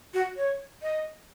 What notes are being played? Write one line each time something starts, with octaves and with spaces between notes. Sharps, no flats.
F#4
C#5
D#5